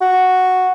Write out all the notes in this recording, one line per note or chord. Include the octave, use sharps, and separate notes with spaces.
F#4